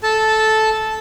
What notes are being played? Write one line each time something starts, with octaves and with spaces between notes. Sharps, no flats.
A4 A5